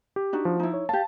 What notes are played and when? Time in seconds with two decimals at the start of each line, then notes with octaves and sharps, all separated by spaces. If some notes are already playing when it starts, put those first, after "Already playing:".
0.16 G4
0.33 D4 D#4 F#4
0.45 F3
0.60 D#4 E4
0.74 C#5
0.89 G4 F5 A5